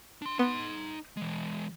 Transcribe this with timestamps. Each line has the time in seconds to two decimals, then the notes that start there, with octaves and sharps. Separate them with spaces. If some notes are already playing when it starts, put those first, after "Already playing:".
0.22 D4 C6
0.39 B3 D#4 C6
1.17 E3 G#3